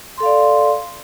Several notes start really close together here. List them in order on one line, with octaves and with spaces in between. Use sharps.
C6 A4 F5 D5